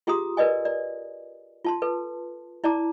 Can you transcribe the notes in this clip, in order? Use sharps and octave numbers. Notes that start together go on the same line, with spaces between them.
F4 G4 G#4 A#5 C6 D#6
A#4 B4 D5 D#5 G#5
D5
F4 A5 C6
A4 B4
E4 D5 A5 A#5 D6